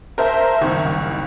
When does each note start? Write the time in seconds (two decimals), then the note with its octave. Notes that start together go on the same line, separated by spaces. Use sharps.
0.18 A#4 C5 E5 A5
0.61 F#1 C2 D#3 C#6